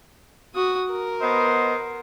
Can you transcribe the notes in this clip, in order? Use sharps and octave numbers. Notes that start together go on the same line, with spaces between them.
F#4 D#6
A#4
B3 C5 D#5